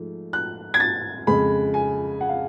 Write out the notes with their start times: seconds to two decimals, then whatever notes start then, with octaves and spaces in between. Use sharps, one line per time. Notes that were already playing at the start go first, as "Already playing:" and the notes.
Already playing: G#2 F3 A3
0.33 F#6
0.74 G#6
0.80 A6
1.27 F2 C#3 G#3 B5
1.74 G#5
2.21 F#5
2.29 F5